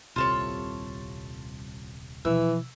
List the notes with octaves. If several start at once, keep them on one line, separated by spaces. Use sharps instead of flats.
D#1 C2 C3 F4 A4 C#5
B2 E3 F3 E6